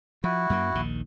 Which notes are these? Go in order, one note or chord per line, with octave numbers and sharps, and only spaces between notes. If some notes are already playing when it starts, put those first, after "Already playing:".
F3 E4 F#4
F#2 F#3 A#3
A#1 D#2 D#3